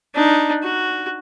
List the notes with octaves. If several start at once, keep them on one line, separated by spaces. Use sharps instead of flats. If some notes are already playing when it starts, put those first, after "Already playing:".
D4 D#4
F#4